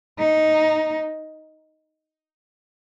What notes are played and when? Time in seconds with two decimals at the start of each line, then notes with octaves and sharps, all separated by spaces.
0.19 D#4